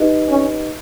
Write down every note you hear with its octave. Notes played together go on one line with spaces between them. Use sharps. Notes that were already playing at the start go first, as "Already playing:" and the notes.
Already playing: D#4 G4 B4 D#5
C#4